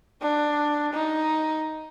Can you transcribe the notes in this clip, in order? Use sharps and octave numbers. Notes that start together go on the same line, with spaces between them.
D4
D#4